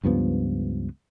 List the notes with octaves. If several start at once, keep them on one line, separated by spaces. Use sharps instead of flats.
C#2 G2 F3 B3